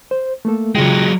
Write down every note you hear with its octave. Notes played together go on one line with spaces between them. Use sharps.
C5
A3 A#3 A4
C#3 F#3 G#3 F4 G5